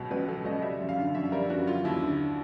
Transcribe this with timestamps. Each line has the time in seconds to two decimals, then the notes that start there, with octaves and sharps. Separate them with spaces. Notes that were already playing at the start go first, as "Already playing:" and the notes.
Already playing: C#2 B2 F#3
0.11 C#2 B4
0.28 F#3 A4
0.45 C#2 D#5
0.62 G3 E5
0.81 F#2
0.89 F5
0.98 D3
1.15 F#2 E5
1.32 G3 A#4
1.50 F#2 F#4
1.67 F#3 F4
1.84 D#2 E4
2.03 D3